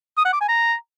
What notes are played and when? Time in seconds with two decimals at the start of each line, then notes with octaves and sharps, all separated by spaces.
0.17 D#6
0.25 F#5
0.33 D6
0.41 G#5
0.48 A#5